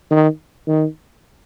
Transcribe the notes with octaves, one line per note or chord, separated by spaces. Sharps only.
D#3
D#3